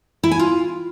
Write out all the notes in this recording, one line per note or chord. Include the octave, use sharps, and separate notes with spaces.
E4
G#5
F4